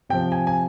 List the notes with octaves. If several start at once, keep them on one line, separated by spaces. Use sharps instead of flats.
C3 F3 G5
G#5
G#5